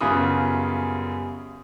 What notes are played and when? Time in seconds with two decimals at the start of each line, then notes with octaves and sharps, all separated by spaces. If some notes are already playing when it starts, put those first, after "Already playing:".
0.01 F#2 C#3 G3 B3 F4 D#6